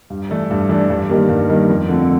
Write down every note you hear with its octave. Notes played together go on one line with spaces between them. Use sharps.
G2
E3 A3 D4
G2
E3 A3 D4
G2
D#3 G3 A#3
G2
D#3 G3 A#3
F2
D3 F3 A3 C4